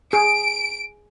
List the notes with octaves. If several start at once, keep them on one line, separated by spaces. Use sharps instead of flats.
G#4 D7